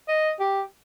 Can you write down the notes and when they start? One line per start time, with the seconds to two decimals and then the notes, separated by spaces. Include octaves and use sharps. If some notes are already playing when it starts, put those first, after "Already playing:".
0.08 D#5
0.40 G4